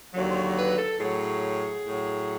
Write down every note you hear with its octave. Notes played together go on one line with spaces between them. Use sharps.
D#2 D3 F#3
C5
C#5
B4
A4
A2 F#3 G#4
A2 F#3